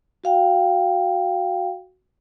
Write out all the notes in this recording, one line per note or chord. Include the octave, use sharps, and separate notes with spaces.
F#4 F5 G5